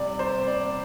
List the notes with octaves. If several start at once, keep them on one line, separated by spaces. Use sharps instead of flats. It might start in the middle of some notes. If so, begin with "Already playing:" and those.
Already playing: C3 G3 D5
C5
D5